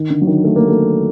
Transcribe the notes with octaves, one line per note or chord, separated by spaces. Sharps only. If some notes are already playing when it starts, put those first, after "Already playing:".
Already playing: D#3
D3
F#3
D#3
A3
A#3
A3